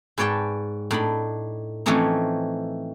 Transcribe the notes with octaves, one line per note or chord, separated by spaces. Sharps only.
G#2 B4 C#5 D5 G5 A5
A2 D4 D#4 B5
E3 F3 A3 C4 C#4 D#4